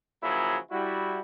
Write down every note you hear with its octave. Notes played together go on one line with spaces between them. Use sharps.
C#3 F3 F#3 A#3 E4 G#4
G3 E4 F#4